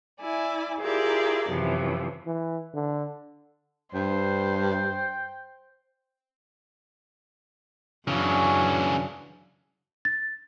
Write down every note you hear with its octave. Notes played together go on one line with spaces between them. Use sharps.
E4 D5 G#5
E4 F4 G4 G#4 A#4 D5
F#2 C3 E3 F3
E3
D3
G2 C5 G5
F#2 C#3 E3 F#3 C#4 D4
A6